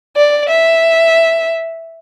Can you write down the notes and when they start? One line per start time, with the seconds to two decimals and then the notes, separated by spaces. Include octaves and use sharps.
0.16 D5
0.49 E5